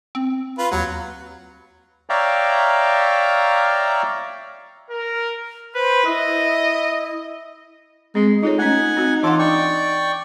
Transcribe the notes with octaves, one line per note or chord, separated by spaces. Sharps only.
C4
F4 B4
D#2 F#3
C#5 D5 E5 F5 G5 A#5
A#4
B4 C5
E4 D#5
G#3 C4
D#4 F4 A4 C#5
A3 C#4 F#5 G#5
C4 F#4
E3 D4 F4 A4 F#5 D6
D5 G5 C#6